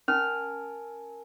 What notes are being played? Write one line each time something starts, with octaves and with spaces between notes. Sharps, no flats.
C#4 A#4 G#5 A5 F6